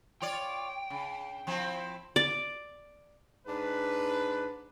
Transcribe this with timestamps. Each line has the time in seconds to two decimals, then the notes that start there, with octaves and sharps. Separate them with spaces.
0.22 F4 C#5 D5 G5
0.90 C#3
1.47 F3 C4 E4
2.16 D5
3.47 G#2 D4 B4